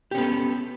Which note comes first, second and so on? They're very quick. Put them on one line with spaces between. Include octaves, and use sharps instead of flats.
G4 C#4 B3 A4